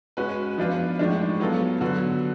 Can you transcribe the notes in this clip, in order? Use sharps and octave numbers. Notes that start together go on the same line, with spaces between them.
G#3 C#4 F#4 B4
F3 B3 D4 F4 B4
A2 F3 G#3 D4
F#3 B3 F4 A4
D3 F#3 B3 F#4